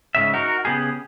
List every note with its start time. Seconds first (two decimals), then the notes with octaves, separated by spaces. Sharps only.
0.15 G#2 C#3 E5
0.34 D#4 F#4 A#4
0.65 C#3 B3 G4 G#4